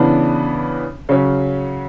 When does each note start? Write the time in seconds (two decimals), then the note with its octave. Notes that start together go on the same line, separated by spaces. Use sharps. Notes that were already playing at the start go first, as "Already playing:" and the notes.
Already playing: C#3 E3 B3 D4
1.09 C#3 F#3 C#4